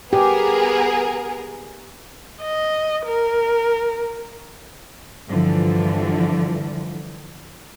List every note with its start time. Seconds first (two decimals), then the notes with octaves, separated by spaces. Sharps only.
0.13 B3 G4 G#4 A#4
2.41 D#5
3.06 A#4
5.30 G2 D3 E3 F3